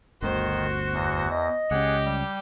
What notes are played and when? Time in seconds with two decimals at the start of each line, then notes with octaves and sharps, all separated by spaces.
0.22 G1 D2 D#3 F#4 C5
0.93 E2 A#6
1.31 D#5
1.71 C#2 C#4 G4 G#4 F#5
2.06 G3